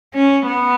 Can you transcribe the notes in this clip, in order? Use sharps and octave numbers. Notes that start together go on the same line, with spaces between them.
C#4
B3